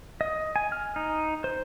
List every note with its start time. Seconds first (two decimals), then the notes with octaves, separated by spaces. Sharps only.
0.21 D#5
0.56 G#5
0.72 F6
0.96 D#4
1.44 C5